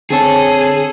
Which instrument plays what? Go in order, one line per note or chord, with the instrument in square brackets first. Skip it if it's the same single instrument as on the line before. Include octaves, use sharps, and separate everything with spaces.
[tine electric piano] D3 C4 C#5 [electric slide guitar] G#4 [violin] A4